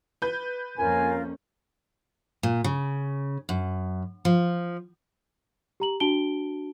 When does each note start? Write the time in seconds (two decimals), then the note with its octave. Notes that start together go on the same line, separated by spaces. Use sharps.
0.22 B4 G6
0.78 F2 A#3 C#4 F4 A#4 G#5
2.43 A#2
2.64 C#3
3.49 F#2
4.25 F3
5.80 G4 A#5 F#7
6.00 D4 F#4 A5 D7 G7